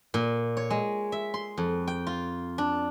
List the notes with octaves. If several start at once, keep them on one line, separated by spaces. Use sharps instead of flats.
A#2
C#5
G#3
E5
C6
F2
G5
F4
D4